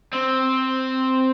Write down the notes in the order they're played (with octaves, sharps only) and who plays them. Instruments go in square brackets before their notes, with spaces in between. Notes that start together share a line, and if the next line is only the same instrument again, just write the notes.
[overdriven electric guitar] C4